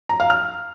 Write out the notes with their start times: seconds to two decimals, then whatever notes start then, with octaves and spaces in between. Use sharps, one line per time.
0.09 A#5
0.20 F5
0.30 F6